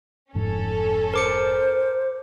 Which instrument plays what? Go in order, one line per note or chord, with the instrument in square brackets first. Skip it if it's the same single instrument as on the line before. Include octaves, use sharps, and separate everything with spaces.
[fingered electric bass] F1 G#2 F3 [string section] C#4 A4
[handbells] A#4 D6 C#7 [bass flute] C5